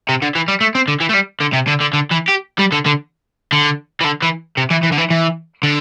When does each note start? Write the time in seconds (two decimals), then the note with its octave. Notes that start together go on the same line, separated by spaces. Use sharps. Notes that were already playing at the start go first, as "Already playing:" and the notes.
0.09 C3
0.22 D3
0.35 E3
0.48 G3
0.61 A3
0.75 C4
0.88 D3
1.01 E3
1.09 A3
1.14 G3
1.41 D3
1.53 C3
1.67 D3
1.80 D3
1.93 D3
2.11 E3
2.29 G4
2.59 G3
2.72 D3
2.86 D3
3.53 D3
4.01 E3
4.05 D3
4.22 E3
4.57 C3
4.71 E3
4.84 E3
4.92 D3
4.98 E3
5.10 E3
5.63 D3